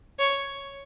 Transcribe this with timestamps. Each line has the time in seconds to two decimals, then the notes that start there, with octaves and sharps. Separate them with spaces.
0.19 C#5